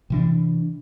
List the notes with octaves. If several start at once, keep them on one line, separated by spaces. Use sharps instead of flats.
C3 E3 D4